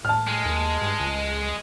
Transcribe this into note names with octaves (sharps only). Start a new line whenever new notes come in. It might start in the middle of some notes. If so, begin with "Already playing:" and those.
A2 A5 F6
G#3
D#2
G2
C#2